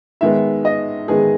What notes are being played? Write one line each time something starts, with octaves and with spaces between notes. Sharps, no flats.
D#3 G#3 B3 E5
D#5
D#3 G#3 B3 G#4